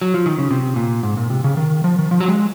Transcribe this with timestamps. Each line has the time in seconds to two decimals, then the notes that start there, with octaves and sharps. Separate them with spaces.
0.02 F#3
0.14 F3
0.26 D#3
0.38 C#3
0.51 C3
0.76 A#2
1.03 G#2
1.17 A#2
1.30 C3
1.44 C#3
1.57 D#3
1.84 F3
1.99 D#3
2.11 F3
2.21 F#3
2.28 G#3